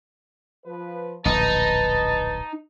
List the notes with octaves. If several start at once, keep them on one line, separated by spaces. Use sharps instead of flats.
F3 B4
D1 A#1 D#4 B4 A5